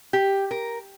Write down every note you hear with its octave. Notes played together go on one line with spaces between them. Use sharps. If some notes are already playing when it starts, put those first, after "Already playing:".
G4
A#4